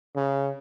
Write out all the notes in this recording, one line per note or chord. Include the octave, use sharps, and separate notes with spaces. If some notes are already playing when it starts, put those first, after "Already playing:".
C#3